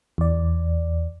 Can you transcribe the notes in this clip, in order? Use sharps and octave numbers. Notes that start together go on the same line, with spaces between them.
E2 D5